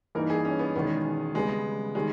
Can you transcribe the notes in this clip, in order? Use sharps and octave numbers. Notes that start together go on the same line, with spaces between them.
G2 E3 A#3 D#4 A#4
G#4
C#4
B3
E1 E2 D#3 G#3 B3
C#3 G3 G#3 B3
D#3 G3 G#3